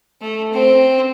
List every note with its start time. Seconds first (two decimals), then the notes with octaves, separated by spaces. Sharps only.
0.22 A3
0.53 C4